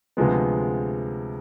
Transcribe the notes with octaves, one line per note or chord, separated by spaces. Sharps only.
D2 C3 F3 G#3 B3